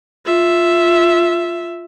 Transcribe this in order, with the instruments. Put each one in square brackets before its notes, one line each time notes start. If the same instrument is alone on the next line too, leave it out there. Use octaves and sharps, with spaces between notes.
[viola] F4 E5